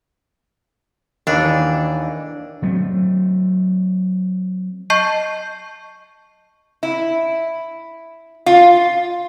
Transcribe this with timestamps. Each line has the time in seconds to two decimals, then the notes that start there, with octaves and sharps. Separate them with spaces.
1.27 D#2 E3 D4 D#4
2.62 F#3 A3 C4
4.90 D#5 A5 C#6 G6 C7
6.83 E4
8.46 F4